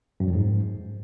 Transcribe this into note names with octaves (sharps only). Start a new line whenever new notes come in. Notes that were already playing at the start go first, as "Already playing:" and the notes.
F#2
F2
G#2